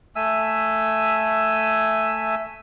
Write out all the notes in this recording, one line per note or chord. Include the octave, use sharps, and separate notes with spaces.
A3 E5 G#5 E6